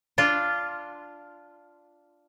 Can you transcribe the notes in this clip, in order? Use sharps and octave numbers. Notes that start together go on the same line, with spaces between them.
D4 F4